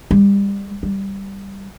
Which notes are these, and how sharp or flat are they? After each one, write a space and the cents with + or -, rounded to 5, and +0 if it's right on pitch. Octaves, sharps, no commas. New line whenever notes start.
G3 +30
G3 +0